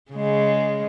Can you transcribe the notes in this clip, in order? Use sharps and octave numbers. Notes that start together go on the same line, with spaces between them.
C#3 G#3